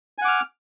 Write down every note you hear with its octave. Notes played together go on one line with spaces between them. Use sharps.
F#5 G#5 D6 F6